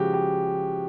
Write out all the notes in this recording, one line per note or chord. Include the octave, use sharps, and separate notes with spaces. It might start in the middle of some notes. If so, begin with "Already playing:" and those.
Already playing: C#3 F3 G#3 F#4 G4
G4